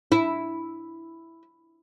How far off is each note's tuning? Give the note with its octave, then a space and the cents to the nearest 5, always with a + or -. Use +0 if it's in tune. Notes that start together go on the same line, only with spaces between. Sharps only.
E4 +0